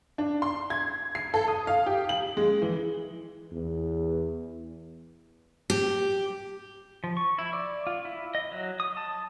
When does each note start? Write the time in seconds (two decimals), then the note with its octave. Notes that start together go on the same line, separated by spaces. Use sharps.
0.18 D4
0.42 C6
0.70 G#6
1.15 C7
1.34 A4
1.48 D#6
1.67 F5
1.86 G4
2.09 F#7
2.37 G#3
2.62 E3
3.53 E2
5.70 G4
7.04 F3
7.17 C#6
7.38 E4
7.53 D5
7.87 F4
8.05 E4
8.35 D#5
8.52 F#3
8.80 D#6
8.97 A5